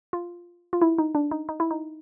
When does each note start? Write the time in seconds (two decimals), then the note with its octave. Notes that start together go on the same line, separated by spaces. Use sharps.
0.13 F4
0.73 F4
0.82 E4
0.98 D#4
1.15 D4
1.31 D#4
1.49 D#4
1.60 E4
1.71 D#4